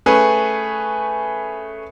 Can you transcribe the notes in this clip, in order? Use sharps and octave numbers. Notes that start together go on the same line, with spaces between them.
A3 C#4 G#4 B4